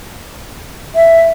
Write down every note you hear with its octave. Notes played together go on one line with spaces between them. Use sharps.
E5